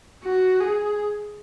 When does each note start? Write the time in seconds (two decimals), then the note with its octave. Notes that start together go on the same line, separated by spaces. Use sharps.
0.24 F#4
0.60 G#4